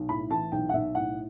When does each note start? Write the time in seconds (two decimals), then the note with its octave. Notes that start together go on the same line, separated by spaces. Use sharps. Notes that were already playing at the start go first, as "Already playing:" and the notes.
Already playing: B1
0.09 A2 B5
0.31 E3 A5
0.52 B1 G5
0.69 F#5
0.73 B1 E5
0.95 A2 F#5